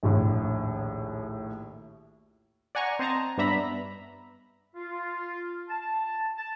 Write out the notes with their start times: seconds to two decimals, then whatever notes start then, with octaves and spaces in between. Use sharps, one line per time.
0.03 A#1 D#2 A2
2.75 D5 F#5 G#5 A#5 C#6
2.99 C4 C5 D#5 A5 A#5
3.38 G2 B3 D4 E5 A#5 B5
4.75 F4
5.69 A5
6.38 A5